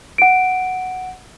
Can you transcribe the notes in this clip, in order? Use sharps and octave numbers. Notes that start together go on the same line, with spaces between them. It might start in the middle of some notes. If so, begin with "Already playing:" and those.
F#5 D7